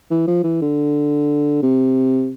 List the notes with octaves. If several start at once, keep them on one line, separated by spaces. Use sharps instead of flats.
E3
F3
E3
D3
C3